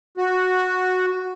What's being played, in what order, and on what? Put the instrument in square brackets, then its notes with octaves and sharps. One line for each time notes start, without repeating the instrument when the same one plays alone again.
[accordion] F#4